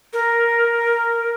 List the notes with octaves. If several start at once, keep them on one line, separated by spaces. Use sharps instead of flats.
A#4